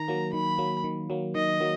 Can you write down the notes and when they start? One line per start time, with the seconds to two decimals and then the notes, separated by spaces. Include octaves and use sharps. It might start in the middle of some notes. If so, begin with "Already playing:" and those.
Already playing: D#3 A#5
0.08 F#3 A#3
0.33 D#3 B5
0.58 F#3 A#3
0.84 D#3
1.10 F#3 A#3
1.35 D#3 D#5
1.60 F#3 A#3